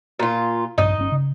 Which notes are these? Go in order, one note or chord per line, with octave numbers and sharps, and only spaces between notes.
A#2 F4
A#1 G2 D#4 D#5
G1 C#4
C#3